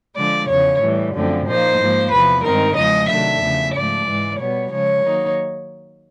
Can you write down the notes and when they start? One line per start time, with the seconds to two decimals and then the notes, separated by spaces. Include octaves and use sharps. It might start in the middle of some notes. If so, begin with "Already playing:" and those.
0.15 D3 F3 G#3 D5
0.48 E2 C#3 F3 C#5
0.81 A2 E3 G3
1.13 F#2 D3 F3 A3 C4
1.45 A#2 F3 A#3 D#4 C5
1.78 G#2 F3 A#3
2.10 E2 C3 F3 B4
2.43 G2 D#3 G#3 C4 D#4 A#4
2.75 E2 C#3 F3 G#3 D#5
3.09 C3 D#3 F#3 A3 D4 E5
3.41 E2 C#3 F3 A3
3.73 G#2 F3 A3 D5
4.06 G#2 E3 G#3
4.38 B2 G3 B3 C#5
4.71 C#3 F3 G#3 C#5
5.03 D#3 F#3 A#3 D#4